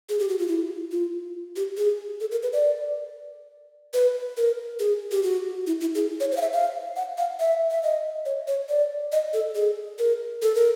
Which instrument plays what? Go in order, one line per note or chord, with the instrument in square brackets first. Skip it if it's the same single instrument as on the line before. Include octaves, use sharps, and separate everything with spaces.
[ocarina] G#4
G4
F#4
F4
E4
F4
G4
G#4
A4
A#4
B4
D5
B4
A#4
G#4
G4
F#4
E4
E4
G#4
C#5
C5
F5
E5
F5
F#5
F5
E5
E5
D#5
C#5
C#5
D5
D#5
A4
G#4
A#4
A4
A#4